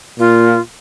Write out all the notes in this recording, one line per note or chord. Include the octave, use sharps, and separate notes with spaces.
A#2 F4